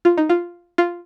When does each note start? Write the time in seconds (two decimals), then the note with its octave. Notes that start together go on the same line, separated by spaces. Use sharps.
0.05 F4
0.17 D#4
0.29 F4
0.78 F4